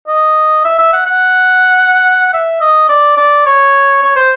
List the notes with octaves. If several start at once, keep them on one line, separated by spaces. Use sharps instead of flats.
D#5
E5
E5
F#5
F#5
E5
D#5
D5
D5
C#5
C#5
C5